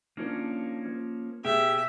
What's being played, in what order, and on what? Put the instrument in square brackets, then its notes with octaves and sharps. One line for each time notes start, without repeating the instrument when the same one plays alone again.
[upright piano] D#3 F3 D4 [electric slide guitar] A#3 C#4
[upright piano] F3
[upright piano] B2 E6 [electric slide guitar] G4 [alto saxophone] G#4 [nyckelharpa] E5